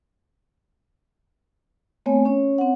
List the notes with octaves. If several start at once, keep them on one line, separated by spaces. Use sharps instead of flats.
A3 B3 C4 C#5 G#5
C#4 C#5
C4 F#5